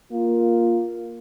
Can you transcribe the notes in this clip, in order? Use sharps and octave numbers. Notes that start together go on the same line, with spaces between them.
A#3 F4